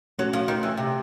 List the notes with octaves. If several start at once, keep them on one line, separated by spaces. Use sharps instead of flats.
F#3 A3 C#4 F#4
F3
D#3
E3
C3